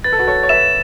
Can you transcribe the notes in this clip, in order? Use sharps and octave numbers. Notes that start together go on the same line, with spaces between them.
B4 A6
A4
F#4 B4
A4 C#5
C#5
B4 E5 E7